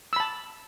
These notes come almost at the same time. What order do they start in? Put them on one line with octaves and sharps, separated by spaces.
E6 B5 A5